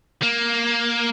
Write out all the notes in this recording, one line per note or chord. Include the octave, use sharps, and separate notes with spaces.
A#3